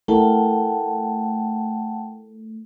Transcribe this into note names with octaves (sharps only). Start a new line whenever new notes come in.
A3 E4 A4 A#4 F#5 G5 A5